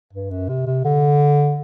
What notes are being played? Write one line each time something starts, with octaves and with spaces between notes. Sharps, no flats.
G2
F#2
C3
C3
D3